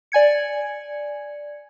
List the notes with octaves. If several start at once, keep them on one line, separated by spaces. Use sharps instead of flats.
D5 G#5 G#6 C#7